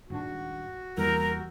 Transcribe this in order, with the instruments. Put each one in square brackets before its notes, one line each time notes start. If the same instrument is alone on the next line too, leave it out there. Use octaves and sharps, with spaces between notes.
[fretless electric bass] D#1 G#2 D4 [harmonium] F#4
[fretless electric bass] E2 [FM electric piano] E3 G3 A#3 [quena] A#4